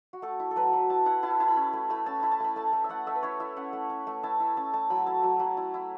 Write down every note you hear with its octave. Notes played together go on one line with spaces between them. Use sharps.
F#4
A3 A4
E4
A4
F#3 B4
F#3
E4 A5
E4 F#5
E4 A5
B5
E4 A5
B5
C#4
A3
A3 B5
C#4 A5
E4 B5
A5
A3 B5
A3 A5
A3
E5
A3 F#5
A3 E5
B4
E4 C#5
E4 E5
C#4 F#5
A3
C#4
A3
E4 A5
E4
C#4 A5
A3 A5
F#3 B5
E4 A5
F#3
F#3
E4
E4